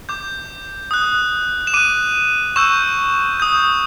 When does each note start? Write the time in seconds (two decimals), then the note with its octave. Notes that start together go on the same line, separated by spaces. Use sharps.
0.09 D6 G6
0.91 D#6 F#6
1.67 E7
1.74 D6 F#6 D#7
2.56 C#6 E6 G6 E7
3.40 D#6 G6